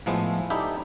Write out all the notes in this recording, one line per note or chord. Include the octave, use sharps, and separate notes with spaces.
A2 F3 G#3 A3 B3
D#4 E4 G4 A4 D5 E5